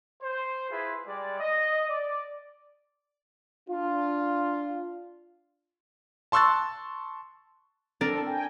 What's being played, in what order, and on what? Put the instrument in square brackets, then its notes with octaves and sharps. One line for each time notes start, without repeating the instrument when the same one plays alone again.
[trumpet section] C5
E4 F4 G#4 B4 C5
G3 G#3 D5
D#5
D5
[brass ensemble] D4 F4
[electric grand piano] A5 C6 C#6 E6 F#6 A6
[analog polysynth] C4 A4 [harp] D4 A#4 D5
[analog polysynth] G5 G#5